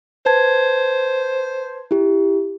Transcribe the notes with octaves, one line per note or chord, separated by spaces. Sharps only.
B4 C5 A5 G#6
E4 G4